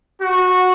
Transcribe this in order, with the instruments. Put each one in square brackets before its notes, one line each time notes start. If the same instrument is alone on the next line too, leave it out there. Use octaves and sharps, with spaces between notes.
[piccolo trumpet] F#4